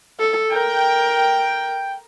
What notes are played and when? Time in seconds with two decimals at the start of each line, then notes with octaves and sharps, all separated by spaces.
0.19 A4
0.52 A#4 G5